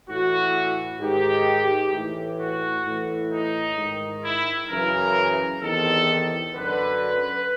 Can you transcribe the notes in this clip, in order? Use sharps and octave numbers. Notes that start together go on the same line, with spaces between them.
A2 E3 F#4
G#2 D#3 G4
A2 E3
F#4
A2 E3
D#4
G#2 D#3
E4
F#2 C#3 E3 A#4
E2 C3 D#3 A4
F#2 D3 B4